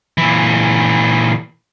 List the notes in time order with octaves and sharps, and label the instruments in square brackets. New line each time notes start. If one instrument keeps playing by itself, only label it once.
[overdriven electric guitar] A#2 E3